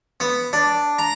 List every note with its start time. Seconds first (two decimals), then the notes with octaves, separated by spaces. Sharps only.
0.20 B3
0.53 D4
0.98 A#5